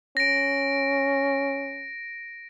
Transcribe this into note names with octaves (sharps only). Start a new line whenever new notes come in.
C#4 A#6 D7